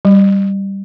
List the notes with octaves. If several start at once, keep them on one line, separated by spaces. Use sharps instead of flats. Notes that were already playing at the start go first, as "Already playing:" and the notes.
G3